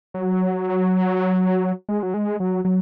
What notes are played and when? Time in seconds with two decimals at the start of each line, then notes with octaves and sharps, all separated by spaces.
0.14 F#3
1.89 G#3
2.03 F#3
2.14 G#3
2.40 F#3
2.65 F#3